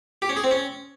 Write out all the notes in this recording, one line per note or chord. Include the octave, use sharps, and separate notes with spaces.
G4
C#4
G#4
C4
C#4